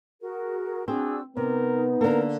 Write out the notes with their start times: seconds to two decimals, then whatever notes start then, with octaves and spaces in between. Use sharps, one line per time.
0.21 F#4 G#4 A#4
0.88 C4 D4 F#4 G#4 E6
1.37 C3 B3 D#4 A#4
2.01 D3 A#3 A#4